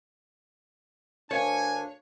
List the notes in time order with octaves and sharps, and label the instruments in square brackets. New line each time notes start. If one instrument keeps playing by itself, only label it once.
[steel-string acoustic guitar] D2 A#4 F5 [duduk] D4 [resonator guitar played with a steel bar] C#5 [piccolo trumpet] G#5